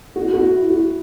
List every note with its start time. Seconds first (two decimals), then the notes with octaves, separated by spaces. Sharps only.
0.16 F#4
0.34 F#4
0.52 E4
0.70 F#4